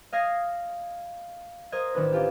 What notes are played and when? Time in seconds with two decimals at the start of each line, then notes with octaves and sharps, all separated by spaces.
0.12 D#5 F5 G#6 A#6 C7
1.72 A#4 C5 D#5 G#6
1.94 A1 D#3 D4 B4
2.13 C#4 D4 F4 G4